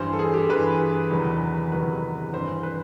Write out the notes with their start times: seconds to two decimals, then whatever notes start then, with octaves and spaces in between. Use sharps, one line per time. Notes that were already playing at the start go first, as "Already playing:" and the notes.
Already playing: G2 E3 C5
0.13 A4
0.19 G#4
0.34 G4
0.49 G2 E3 B4
1.11 E2 C3 D#3 F#3
1.72 E2 C3 D#3 F#3 B4
2.33 G2 E3 C5
2.63 B4